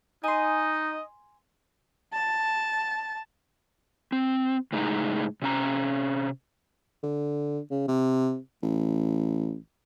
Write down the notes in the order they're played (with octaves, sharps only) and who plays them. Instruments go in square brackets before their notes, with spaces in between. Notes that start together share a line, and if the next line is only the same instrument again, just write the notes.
[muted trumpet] D#4 [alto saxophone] D#5 [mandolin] G#5 C6
[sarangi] A5
[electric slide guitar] C4
A2 C#3 G#3 D#4 G#5 A#5
C3 C#4 A#5
[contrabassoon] D3
C#3
C3
A1